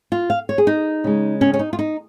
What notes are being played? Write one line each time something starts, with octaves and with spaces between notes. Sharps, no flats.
F4
F5
C#5
G#4
D#4
C#3 G#3
C#4
C#4
D#4
F4
D#4